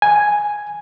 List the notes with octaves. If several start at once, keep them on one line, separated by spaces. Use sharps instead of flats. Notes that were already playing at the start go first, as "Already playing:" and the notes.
G#5